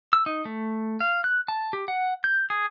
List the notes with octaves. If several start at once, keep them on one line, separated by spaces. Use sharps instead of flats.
E6
D#4
A3
F5
F#6
A5
G4
F#5
G6
G#4